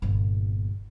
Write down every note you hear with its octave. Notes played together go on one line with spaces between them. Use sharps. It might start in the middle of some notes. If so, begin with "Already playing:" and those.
G1 A#2